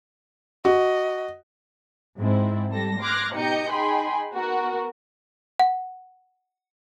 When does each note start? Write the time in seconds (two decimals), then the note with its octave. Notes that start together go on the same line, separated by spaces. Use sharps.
0.65 F#4 D#5
2.19 G#2 C4 E4
2.70 G3 A4 A#6
3.02 C6 D6 F6 F#6 G#6 A#6
3.36 B2 D#4 G4 D#5 G6 C#7
3.71 D#4 G#4 G5 G#5 B5 C6
4.34 B3 F#4 A#4
5.60 F#5